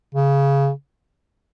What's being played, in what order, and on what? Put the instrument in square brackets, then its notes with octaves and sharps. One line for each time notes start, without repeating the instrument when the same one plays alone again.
[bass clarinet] C#3